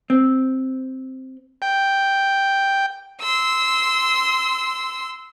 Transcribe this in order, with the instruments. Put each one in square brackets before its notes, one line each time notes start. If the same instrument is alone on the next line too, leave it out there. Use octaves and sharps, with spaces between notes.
[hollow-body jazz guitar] C4
[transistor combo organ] G5
[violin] C6 E6